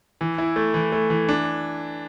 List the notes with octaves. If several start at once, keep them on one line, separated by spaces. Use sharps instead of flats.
E3
E4
A3
E3
A3
E3
D4